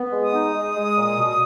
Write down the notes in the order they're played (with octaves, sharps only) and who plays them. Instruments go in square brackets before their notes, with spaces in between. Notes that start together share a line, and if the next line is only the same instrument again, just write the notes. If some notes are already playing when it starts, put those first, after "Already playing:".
Already playing: [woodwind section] B3
G#3
D#6
D#4
G#3
G#3
A#2
B2